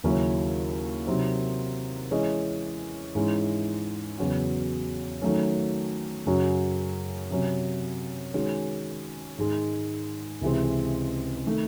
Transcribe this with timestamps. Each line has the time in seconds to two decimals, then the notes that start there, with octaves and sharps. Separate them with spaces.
0.04 D#2 C#3 F#3 C#4 E4
1.07 C3 F#3 C4 D#4
2.11 E3 G#3 C#4 G#4 D#5
3.15 G#2 E3 G#3 C#4 E4
4.18 E2 C#3 F#3 C#4 F#4
5.22 D#3 F#3 A3 C#4
6.26 F#2 C#3 F#3 C#4 F#4
7.30 C3 F#3 C#4
8.34 D#3 G#3 C#4 F#4
9.38 G#2 D#3 G#3
10.41 C#2 C3 E3 G#3 C4
11.46 D#3 A3